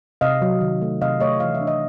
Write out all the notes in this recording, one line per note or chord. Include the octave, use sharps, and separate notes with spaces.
C3 D#5 F5
F#3
D#3
A3
C3 D#5 F5
A3 C#5 D#5
E3 F5
E5
D4
D#5